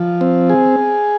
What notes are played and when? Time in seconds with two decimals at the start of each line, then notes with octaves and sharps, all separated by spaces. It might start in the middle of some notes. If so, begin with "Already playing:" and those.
Already playing: F3
0.21 C4
0.50 G#4